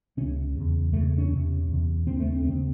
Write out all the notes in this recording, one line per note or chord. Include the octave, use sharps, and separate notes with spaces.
C#2 C3 C#4
E2 C#3
E2 C#3 A3
C#4
E2 C3
E2 C3
D#2 C#3 C4
A3
C4
D#2 C#3 C4